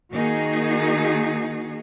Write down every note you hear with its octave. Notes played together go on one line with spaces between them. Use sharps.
D#3 A#3 D#4 F#4 G#4